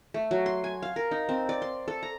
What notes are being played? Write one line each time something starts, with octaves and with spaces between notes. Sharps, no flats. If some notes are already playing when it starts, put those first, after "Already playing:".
A3
F#3
C6
G#5
F5
A#4
D#4
C4
D5
C6
A4
A#5